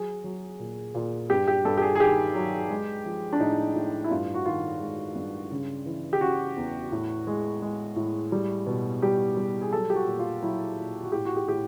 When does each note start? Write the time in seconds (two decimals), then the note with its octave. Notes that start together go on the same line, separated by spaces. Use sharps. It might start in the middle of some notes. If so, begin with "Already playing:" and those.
Already playing: F#3 G#4
0.24 F#3
0.59 A#2
0.95 A#2
1.30 G2 G4
1.48 G4
1.65 G2 A4
1.77 G4
1.82 G#4
1.95 G#4
2.00 D#3 G4
2.35 F#3
2.70 G#3
3.05 F3
3.33 D4
3.40 A2 D#4
3.76 A2
4.04 E4
4.10 G2 F4
4.34 F#4
4.46 D#3 F4
4.80 G#3
5.15 G2
5.52 C#3
5.86 E3
6.13 G4
6.21 C#3 F#4
6.56 E2
6.92 A2
7.27 G#3
7.62 G#3
7.96 A2
8.32 G3
8.67 B2
9.02 G3 G4
9.37 G3
9.61 G#4
9.73 F#3 A4
9.90 G4
9.95 F#4
10.07 A#2
10.19 F4
10.42 F#3 E4
10.77 A#2
11.03 F#4
11.12 A2 G4
11.25 F#4
11.36 G4
11.48 A2 G4